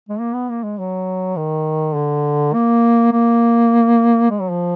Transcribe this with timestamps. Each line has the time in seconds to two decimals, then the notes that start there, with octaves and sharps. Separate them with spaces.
0.09 G#3
0.19 A#3
0.34 B3
0.49 A#3
0.63 G#3
0.79 F#3
1.36 D#3
1.95 D3
2.54 A#3
3.12 A#3
4.30 G#3
4.41 F#3
4.51 F3